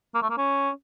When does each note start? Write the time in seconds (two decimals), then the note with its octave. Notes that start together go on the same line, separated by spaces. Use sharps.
0.14 A#3
0.22 A3
0.30 A#3
0.38 C#4